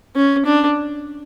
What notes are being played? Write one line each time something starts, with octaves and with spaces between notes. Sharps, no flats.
C#4
D4